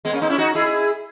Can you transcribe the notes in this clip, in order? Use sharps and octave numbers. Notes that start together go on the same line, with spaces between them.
G#3 B3
A#3 C#4
B3 D#4
C#4 E4
D#4 F#4
E4 G#4